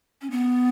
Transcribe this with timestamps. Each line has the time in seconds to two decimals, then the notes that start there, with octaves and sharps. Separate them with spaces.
0.22 C#4
0.31 B3